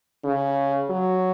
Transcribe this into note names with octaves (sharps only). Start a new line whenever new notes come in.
C#3
F#3